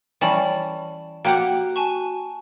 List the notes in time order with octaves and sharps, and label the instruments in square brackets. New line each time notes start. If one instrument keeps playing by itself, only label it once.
[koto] E3 G3 C#4 [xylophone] D5 A5 B5
[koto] A#3 G4 F#5 [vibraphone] F#4 [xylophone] G5
[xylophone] G#5 A5 C#6